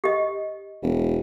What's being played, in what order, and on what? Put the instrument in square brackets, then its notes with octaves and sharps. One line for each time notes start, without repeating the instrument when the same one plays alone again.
[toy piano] G4 D#5
[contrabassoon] E1